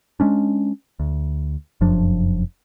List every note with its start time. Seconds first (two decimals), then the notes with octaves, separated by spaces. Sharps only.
0.20 G#3 C#4 D4
1.00 D2
1.81 F1 F#2 F3 D4